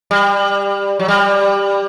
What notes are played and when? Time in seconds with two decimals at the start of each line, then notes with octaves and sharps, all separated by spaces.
0.11 G3
0.99 F#3
1.08 G3